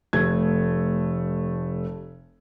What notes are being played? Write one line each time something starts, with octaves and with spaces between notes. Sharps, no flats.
F1 A3 G#6